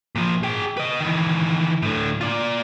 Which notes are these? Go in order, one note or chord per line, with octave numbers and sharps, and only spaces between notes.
A#2 F3
G#4 G5
B4 D#5
D#3 E3
A2 D3
F4 D5